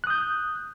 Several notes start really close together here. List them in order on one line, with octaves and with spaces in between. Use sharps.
F#6 D#6 G6